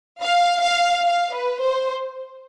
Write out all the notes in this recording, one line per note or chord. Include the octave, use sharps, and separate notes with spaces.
F5
F5
F5
B4
C5